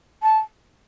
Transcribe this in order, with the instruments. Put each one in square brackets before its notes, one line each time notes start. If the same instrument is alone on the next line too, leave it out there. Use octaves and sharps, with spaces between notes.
[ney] A5